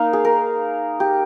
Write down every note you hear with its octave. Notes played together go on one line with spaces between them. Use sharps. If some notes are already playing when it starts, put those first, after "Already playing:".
Already playing: A#3 D#4 F5
G#4
A#4
G4